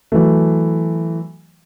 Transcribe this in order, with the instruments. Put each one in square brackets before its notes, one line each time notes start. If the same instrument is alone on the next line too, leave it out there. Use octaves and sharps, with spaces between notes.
[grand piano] E3 F#3 A3